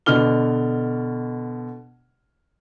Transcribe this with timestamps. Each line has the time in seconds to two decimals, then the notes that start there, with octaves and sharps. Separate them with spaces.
0.06 B2 D3 F6 G7